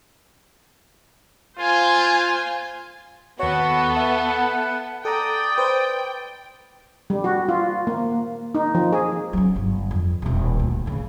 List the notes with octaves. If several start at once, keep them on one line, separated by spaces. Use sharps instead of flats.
F4 C5 G#5
D#2 B3 F#4 A4 C#5 F#5
B4 E5 F#5
A4 D5 G5 A#5 D#6
B4 C5
G3
F#4
F4
A#3
D#4
F3
G#4
F#3 C#4
G1
F2
D#1 C3
D2
A2 C#3